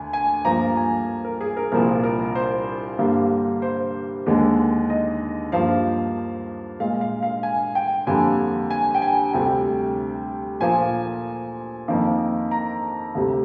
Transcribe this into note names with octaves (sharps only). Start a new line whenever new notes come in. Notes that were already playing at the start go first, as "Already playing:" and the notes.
Already playing: D2 G#5
G#5
G2 F3 A#3 A#5
G#5
A#4
G#4
A#4
C2 A#2 F3 A#4
A#4
C5
G2 D3 G3 A#3
C5
D#2 D3 G#3
D#5
G2 F3 A#3 F5
A#2 G#3 F5
F5
F5
G#5
G5
F2 D3 G3 A#3 G#5
G#5
G5
G#5
D2 C3 G3 G5
A#2 F3 A#3 G#5
F2 D#3 A#3
A#5
D2 C3 G3